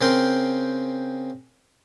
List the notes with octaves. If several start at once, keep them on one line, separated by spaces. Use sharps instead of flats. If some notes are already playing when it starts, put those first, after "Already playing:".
C#3 C4 A#4 G5 C6